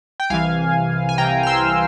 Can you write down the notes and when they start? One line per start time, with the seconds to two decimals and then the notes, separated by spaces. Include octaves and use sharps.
0.20 G5
0.30 C2 C3 E3 F5 G#5
1.09 G#5
1.18 C2 C3 E3 G5 A#5
1.43 F6
1.47 C6 E6